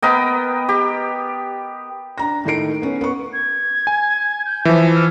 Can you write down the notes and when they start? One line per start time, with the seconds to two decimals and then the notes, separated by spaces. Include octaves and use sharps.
0.02 B3 A#4 D#5 G5
0.69 G4
2.18 D4 A#5 A#6
2.44 A2 D#3 A3 D#4 C7 D7
2.82 B3 C#4
3.01 B3 C#6
3.33 G#6
3.87 G#5
4.46 G6
4.65 E3 F3 E5
4.96 F6